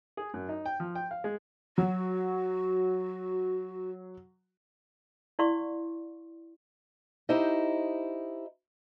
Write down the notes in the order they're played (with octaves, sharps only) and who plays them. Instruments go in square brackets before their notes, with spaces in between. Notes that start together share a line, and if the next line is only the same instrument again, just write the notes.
[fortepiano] G#4
F#2
D#4
G5
F3
G5
F5
G#3
[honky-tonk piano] F#3 [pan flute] F#4
[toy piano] E4 D5 F5 C6 C#6
[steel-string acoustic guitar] D#4 E4 G4 C5 D#5